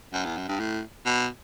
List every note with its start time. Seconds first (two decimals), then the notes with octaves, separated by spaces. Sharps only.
0.13 F#2
0.25 E2
0.37 F#2
0.48 G2
0.60 A2
1.06 B2